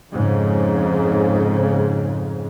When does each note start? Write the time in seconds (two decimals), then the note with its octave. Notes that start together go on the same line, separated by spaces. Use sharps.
0.11 F2 G#2 C#3